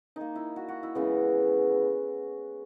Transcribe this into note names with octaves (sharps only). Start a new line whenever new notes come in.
D#3 A#3 D#4
E4
F#4
F#4
E4
C#3 E3 G#3 B3 E4